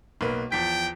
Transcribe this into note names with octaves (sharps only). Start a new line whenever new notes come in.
B1 A#3 B4
E2 F3 G5 B6